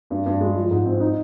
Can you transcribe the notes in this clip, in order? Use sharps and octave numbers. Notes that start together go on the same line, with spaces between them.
G2
G2
G#3
F3
G#2
C4
D#4